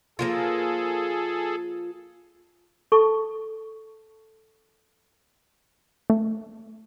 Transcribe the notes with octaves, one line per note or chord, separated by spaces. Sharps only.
F3 A#3 F4 G#4 A4
A4 A5 C#6
A3